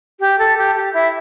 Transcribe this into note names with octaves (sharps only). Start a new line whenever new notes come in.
G4
A4
G4
G4
E4